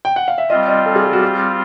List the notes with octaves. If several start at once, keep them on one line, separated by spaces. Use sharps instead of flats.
G5
F#5
F5
E5
G3 C4 F4 D#5
D#5
A4
G#4
G4
F#4
G4